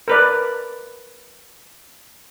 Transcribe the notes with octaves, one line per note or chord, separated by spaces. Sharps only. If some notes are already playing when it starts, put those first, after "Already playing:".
A#4 B4 D5